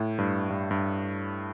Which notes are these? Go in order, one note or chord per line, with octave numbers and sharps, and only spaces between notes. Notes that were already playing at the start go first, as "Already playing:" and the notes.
Already playing: A2
G2
G2
G2